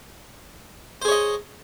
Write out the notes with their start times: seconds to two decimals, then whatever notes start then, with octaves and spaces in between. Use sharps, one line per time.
1.02 C5
1.05 G#4
1.08 C#5
1.11 D#5